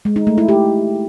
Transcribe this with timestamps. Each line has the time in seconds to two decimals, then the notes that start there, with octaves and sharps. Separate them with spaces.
0.05 G#3
0.16 D#4
0.27 A3
0.38 E4
0.48 G4